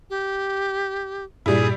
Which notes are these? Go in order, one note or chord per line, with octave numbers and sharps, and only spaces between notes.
G4
G2 A#2 G3 E4 G#4